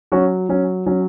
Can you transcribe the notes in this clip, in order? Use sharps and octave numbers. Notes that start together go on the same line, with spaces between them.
F#3 C#4 F#4
F#3 C#4
F#3 C#4